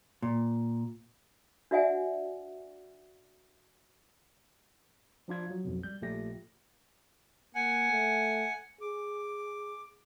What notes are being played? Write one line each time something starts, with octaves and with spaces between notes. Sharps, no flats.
A#2
D4 F#4 D5 E5 F#5 G#5
F3 D4 F4 G#6
F#3
B1 F2 B2
G3 G6
A#1 A#2 A3 G4 A#6
A#3 F#5 G#5
A3
G#4 D6